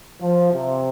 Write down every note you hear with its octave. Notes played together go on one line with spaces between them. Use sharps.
F3
C3